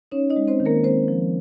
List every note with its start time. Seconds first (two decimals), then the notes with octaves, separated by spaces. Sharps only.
0.12 C#4 D#4 C#5
0.30 D#4 D#5
0.36 G#3
0.48 C4 C5
0.60 D#3
0.66 A#3 A#4
0.84 G#3 C4 C5
1.08 F3